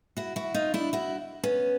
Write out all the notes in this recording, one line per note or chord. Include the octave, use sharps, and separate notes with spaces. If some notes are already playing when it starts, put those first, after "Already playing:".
E4 F#4
E4 F#4
D#4 F4
D4 E4
E4 F#4
B3 C#4